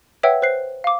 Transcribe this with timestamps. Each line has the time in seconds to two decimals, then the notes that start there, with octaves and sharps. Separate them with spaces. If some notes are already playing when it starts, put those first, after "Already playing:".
0.23 B4 C#5 E5 F#5 G5 E6
0.42 C5 F#6 C7
0.84 F5 D6